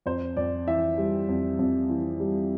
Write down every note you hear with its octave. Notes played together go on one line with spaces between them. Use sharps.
F2 C5
F2 D5
E3 E5
G3
F2
F2
E3
G3